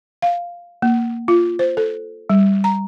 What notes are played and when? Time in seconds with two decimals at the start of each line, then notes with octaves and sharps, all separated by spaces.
0.22 F5
0.82 A#3
1.28 F4
1.59 C5
1.77 A4
2.29 G3
2.64 A#5